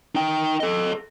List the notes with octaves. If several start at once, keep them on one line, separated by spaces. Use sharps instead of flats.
D#4 G5
A4 D#5